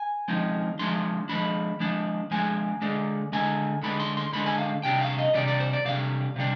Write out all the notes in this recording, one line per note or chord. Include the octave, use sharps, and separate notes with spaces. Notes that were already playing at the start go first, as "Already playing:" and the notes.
Already playing: G#5
F3 G#3 C4 D#4
F3 G#3 D4 C6
F3 G#3 D4 B5
F3 G#3 D4
F3 G#3 D4 G#5
D3 G#3 D4
D3 G#3 D4 G#5
D3 G#3 D4 B5
C6
C6
D3 G#3 D4 B5
G#5
F5
C3 G3 D4 G5
F5
D#5
C3 G3 D4 D5
D5
C5
D5
C3 G3 D4 F5
C3 G3 D4